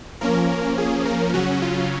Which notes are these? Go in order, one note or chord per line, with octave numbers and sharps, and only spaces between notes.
F3 A#3 C#4 A#4
G#4
A#4
C#3 F#3 C#4 F#4
F4